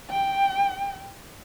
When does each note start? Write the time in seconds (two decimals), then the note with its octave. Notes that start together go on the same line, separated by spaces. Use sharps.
0.10 G5